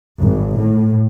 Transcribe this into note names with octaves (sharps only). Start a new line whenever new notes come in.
G#1
A2